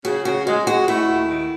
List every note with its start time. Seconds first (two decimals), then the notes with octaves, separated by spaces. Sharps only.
0.04 C#3 F#4
0.25 C#3 F#4
0.47 G#3 F#4
0.66 G#3 F#4
0.88 A3 E4
1.08 D#2
1.29 D#3